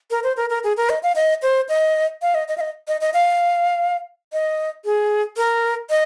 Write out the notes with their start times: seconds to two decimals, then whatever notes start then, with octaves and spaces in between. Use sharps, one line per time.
0.11 A#4
0.24 C5
0.37 A#4
0.50 A#4
0.64 G#4
0.77 A#4
0.90 D#5
1.03 F5
1.16 D#5
1.42 C5
1.69 D#5
2.22 F5
2.35 D#5
2.48 D#5
2.58 F5
2.61 D#5
2.88 D#5
3.01 D#5
3.14 F5
4.33 D#5
4.85 G#4
5.37 A#4
5.90 D#5